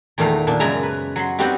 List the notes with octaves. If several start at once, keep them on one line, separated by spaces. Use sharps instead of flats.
E2 A#2 D#3 A3 F5 A#5
A#2 D4
F#2 C#3 G#3 E5 A#5 B5
B4
F#3 B5 C6
G3 B3 C4 D#4 F#4 G4